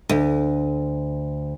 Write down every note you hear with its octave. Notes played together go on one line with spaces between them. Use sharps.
D2